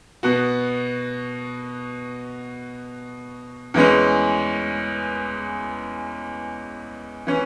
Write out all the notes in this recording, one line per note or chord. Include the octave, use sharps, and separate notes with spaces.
B2 B3 F#4
E2 E3 G#3 C#4
E3 C#4